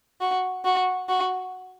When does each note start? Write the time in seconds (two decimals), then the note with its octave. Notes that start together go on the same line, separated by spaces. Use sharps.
0.21 F#4
0.65 F#4
1.09 F#4